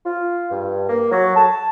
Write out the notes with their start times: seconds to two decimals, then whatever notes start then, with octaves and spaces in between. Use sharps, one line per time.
0.04 F4
0.51 G2
0.88 A#3
1.11 F#3
1.36 A5